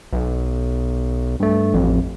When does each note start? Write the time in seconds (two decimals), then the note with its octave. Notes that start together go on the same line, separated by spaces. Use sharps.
0.13 B1
1.40 G2 A3
1.74 A1 F2